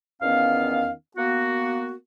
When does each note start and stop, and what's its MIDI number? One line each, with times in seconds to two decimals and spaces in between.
0.21 0.91 40
0.21 0.91 51
0.21 0.91 59
0.21 0.91 61
0.21 0.91 77
1.17 1.94 58
1.17 1.94 59
1.17 1.94 66